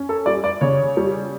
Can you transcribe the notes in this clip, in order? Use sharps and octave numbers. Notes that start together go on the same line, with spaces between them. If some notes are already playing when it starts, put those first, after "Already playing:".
Already playing: C#4
A4
G3 D5
D5
C#3 C#5
G3